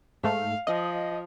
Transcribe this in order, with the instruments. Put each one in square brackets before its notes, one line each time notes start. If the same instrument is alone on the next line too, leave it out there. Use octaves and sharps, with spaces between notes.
[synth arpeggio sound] G#2 A3 [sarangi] F5
[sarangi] F3 [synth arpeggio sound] D#5